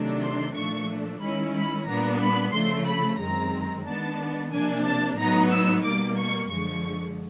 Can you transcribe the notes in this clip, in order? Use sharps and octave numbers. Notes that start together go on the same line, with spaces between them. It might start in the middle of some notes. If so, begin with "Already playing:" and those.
Already playing: C3 D#3 F#3 A3 D4
C6
A#2 F3 A3 D4 C#6
D#3 G#3 C#4 E4 B5
B5
A#2 G3 B3 D4 A#5
B5
C#3 F3 A3 C6
B5
F#2 D#3 G#3 C4 A#5
D#3 G#3 B3 D4 A5
C3 F3 A#3 D4 G#5
A5
A2 F#3 B3 D#4 A#5
E6
B2 G3 A#3 D6
C#6
F#2 D3 F3 G#3 C#6